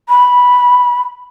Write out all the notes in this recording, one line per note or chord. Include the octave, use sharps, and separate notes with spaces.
B5